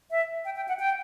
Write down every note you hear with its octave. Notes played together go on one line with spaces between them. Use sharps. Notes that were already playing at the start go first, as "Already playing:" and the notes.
E5
G5
G5
F#5
G5